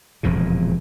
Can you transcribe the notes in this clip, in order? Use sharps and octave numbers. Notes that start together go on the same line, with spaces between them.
E1 F2 A#2 C#3